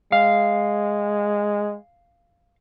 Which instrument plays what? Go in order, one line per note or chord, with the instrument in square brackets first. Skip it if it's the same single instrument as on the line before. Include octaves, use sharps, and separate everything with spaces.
[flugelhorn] G#3 [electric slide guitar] F5